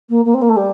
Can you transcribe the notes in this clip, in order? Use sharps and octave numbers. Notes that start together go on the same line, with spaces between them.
A#3
A#3
C4
A#3
A3
G3